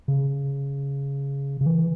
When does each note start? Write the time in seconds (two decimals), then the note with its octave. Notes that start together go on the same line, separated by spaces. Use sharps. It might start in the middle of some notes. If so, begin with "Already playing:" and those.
0.08 C#3
1.61 C#3
1.66 E3